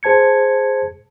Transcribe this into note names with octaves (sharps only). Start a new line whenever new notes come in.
G#4 C5 A5 G#6 C#7